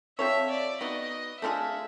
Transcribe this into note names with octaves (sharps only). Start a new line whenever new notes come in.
C4 F4 A4 C#5 E5
D5
B3 D#4 F#4 D#5
A3 D4 F4 G#4 E5